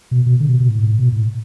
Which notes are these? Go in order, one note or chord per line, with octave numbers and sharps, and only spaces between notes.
B2
B2
D3
B2
B2
A2
A2
B2
A2